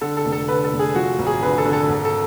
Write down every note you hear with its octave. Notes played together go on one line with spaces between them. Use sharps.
D3 A4
A4
F1
A4
D3 B4
A4
F1
G#4
F3 F#4
G#1
G#4
D3 B4
A4
D3
A4
G#1
A4